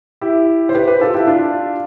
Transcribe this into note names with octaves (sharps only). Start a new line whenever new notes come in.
E4 G4
C5
G4 B4
G4 B4
F4 A4
E4 G4
D4 F4